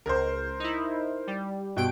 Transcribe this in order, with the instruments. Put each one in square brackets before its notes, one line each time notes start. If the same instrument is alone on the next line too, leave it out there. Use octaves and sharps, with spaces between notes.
[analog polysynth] C#2 [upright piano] A#4 C5
[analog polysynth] D#4 E4
G3
[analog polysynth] G2 G5 D7 [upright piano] B2